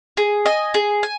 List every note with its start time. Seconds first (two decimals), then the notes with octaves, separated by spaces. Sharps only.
0.17 G#4
0.46 D#5 G#5
0.74 G#4
1.03 G#5